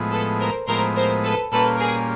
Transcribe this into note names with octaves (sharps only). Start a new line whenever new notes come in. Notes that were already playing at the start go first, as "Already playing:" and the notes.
Already playing: A2 F3 G#3 B3
A4 B4
A#4 C5
A2 F3 G#3 B3 A#4 C5
A#4 C5
A4 B4
A#2 G3 A#3 C#4 F4 A4 B4
G#4 A#4